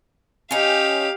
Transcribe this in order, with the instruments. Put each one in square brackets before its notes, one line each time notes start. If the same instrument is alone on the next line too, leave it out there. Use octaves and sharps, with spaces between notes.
[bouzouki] C#4 D#4 [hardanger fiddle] G4 F5